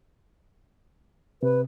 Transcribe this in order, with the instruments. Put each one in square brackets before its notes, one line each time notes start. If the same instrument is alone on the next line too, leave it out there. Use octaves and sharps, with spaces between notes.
[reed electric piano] C3 [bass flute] B4